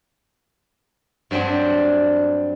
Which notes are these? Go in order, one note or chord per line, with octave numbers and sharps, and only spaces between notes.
G2 F#3 G3 C4 D4